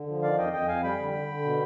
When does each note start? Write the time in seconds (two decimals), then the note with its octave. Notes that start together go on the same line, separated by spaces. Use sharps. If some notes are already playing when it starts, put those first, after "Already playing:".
Already playing: D3
0.08 F3
0.23 D#3 D5 F5
0.37 F2 D#5 G5
0.53 F2 D#5 G5
0.68 F2 F5 G#5
0.83 G3 G5 B5
0.99 D3
1.14 D3
1.28 D3
1.43 B2